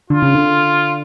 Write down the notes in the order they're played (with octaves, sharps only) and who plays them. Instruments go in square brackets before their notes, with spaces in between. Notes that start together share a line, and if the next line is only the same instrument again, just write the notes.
[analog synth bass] D3 [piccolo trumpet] F4
[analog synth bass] C#3
D3